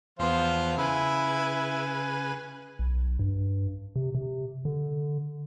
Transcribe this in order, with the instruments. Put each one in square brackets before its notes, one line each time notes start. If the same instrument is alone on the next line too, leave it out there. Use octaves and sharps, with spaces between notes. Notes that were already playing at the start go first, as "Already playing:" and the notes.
[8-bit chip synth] E2 B3 [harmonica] F3 F4 C5
[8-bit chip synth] C#3 B4 G#5 [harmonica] E4
[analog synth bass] B1
G2
C3
C3
D3